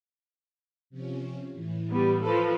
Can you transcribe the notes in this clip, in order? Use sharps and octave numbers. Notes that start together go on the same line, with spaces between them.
C3 F3 C#4
A2 E3
G3 B3
F3 A4 B4